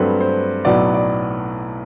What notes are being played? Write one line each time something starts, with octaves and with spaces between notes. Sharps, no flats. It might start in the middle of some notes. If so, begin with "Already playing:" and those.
Already playing: G2 F#3 A3 C4 B4
C5
B1 A2 F#3 B3 D5
D5